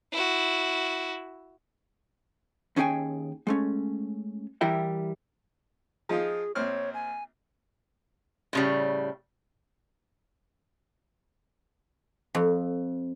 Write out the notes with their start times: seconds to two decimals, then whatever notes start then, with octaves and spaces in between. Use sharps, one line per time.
0.12 E4 F#4
2.76 D#2 C#4 D#4 G#4 G5 G#5
3.47 G#3 A3 C#4
4.61 E3 G3 E4 A#4 E5 G5
6.09 F3 D#4 F4 G#4
6.55 A#1 C4 C#5 F6
6.94 G#5
8.53 A2 C#3 G3
12.35 F2